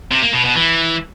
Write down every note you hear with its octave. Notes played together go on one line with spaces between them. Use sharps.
C3
A#3
B2
B2
E3